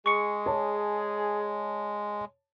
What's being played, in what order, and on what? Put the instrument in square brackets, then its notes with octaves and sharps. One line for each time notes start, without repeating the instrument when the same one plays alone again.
[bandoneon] G#3 [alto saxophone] G#4 [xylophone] C#6 C#7
[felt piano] C#5 A5